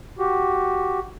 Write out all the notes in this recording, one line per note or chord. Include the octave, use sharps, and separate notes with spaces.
F#4 G4